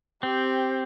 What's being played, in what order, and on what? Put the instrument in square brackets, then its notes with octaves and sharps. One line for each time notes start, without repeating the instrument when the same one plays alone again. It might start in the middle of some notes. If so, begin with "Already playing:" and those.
[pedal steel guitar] C4 [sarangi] G4